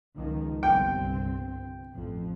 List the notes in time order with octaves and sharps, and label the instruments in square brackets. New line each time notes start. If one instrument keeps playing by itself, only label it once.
[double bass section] C#2 D#3 F3
[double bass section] G1 C2 C4 [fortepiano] G5
[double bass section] A1 F2 F3